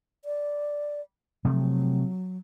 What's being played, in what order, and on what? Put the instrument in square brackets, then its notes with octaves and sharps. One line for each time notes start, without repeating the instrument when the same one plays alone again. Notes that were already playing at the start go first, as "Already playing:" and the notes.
[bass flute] D5
[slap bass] C3 F3 A3 [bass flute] F#3